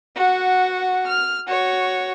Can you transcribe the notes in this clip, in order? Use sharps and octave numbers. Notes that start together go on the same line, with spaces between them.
F#4 F#5
F6
F#4 C#5